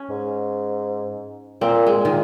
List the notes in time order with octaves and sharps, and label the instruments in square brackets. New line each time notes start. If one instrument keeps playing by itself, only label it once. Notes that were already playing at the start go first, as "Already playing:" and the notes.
Already playing: [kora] C#4
[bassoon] G#2
[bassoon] A#2 [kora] C4
[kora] G#3
[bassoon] A#2
[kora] D#3